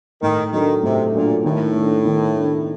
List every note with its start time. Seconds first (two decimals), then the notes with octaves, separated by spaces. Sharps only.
0.22 A2 D#3
0.52 D#3 F#3 A3 D4
0.83 A2 C3
1.13 A#2 F#3 A3 D4
1.44 A2 D#3
1.75 A3 D4
2.05 D#3
2.36 A3 D4